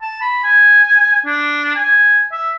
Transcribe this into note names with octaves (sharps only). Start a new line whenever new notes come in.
A5
B5
G#5
D4
G#5
E5